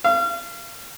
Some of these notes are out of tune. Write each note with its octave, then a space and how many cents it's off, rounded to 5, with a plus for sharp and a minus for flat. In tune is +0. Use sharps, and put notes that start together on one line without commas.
F5 -35